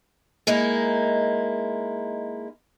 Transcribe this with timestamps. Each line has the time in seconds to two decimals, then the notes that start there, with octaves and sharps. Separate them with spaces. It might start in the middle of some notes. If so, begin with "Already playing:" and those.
0.47 G#3 A#3 D#4 E4